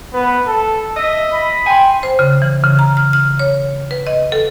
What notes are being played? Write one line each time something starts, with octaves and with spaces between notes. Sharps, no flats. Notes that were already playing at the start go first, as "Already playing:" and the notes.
B3
A4
D#5 E5 E6
B5
G5 G#5 C6
C5
C#3
E3
C#3
A#5
F6
F6
C#5
B4
D#5
A4